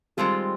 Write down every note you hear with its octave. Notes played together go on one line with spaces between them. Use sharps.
D#3 G3 G#3 C4 F4 A4